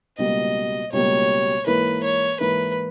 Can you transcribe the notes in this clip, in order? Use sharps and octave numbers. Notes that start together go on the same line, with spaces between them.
C#2 B2 G3 A#3 D#5
C#2 B2 G3 A#3 C#5
G#2 E3 A#3 E4 A#4 B4
C#5
G#2 E3 A#3 E4 A#4 B4